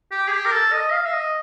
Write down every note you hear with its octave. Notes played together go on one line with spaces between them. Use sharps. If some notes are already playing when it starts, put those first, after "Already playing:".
G4
G#4
G4
A#4
A4
D#5
F5
E5
D#5